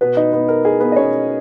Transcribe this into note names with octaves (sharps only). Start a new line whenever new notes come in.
B2 B3 B4
D#4 D#5
B2 B3 B4
A#4
D#4 G#4
B3 B4
D#5
B2 C#4 C#5